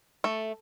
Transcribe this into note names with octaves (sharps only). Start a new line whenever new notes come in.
A3